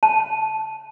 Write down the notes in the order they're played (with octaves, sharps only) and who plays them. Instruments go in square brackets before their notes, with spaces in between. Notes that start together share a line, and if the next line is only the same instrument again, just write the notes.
[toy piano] A5